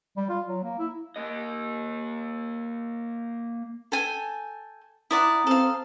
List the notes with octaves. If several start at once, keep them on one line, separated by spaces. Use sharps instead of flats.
G3
F4
F#3
A#3
E4
A#3 D#5
A4 G5 G#5
E4 D5 F#5 A#5 D#6
C4 A4 F5